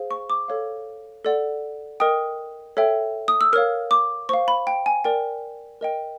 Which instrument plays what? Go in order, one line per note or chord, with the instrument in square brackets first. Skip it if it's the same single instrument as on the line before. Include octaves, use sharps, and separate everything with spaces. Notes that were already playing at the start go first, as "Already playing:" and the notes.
Already playing: [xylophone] G#4 C5 F5
C#6
D6
A4 C#5 F5
A4 D5 F#5
A#4 D#5 G5 D#6
A4 C#5 E5 G5
D#6
E6
A#4 C#5 F5 F6
D6
C5 C#6
F5
B5
G5
G#5
A#4 D5 G5
A#4 D#5 G5